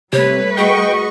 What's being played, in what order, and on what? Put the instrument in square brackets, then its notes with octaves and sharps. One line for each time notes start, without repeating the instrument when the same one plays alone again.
[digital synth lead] C3 [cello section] G3 A3 B4 [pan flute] C#5
[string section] F#4 D#5 C#6 [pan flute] G#4 [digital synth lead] G5